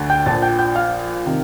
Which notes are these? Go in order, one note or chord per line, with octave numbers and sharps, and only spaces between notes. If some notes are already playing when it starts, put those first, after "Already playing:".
Already playing: D2 D3
G5 G6
A#1 A#2 F3 A5 A6
G5 G6
G5 G6
F5 F6
C3 D#3